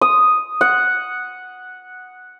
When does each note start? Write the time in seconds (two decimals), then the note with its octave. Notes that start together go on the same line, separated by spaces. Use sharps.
0.01 D#6
0.61 F#5